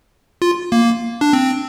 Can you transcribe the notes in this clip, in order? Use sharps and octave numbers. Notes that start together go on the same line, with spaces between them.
F4
A#3
D4
C4